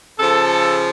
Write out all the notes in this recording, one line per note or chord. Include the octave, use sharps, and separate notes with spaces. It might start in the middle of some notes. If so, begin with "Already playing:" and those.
C#3 F3 A4